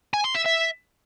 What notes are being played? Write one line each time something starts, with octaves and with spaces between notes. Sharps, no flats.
G#5
C6
E5
E5